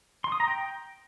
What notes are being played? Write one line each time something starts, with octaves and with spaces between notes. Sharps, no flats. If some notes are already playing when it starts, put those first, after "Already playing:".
C6
D#6
A#5
G5